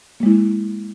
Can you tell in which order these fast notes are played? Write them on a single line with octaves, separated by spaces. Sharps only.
A#3 G#3 E4